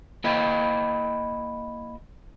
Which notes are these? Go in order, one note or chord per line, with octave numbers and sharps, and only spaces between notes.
A#3 E4 D#5 G5